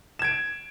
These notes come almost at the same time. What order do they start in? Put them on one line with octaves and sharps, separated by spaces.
E7 G#6 D7